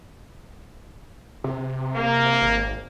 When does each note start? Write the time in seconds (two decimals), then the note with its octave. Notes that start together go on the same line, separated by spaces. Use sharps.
1.44 C3
1.95 A#3
2.42 G#1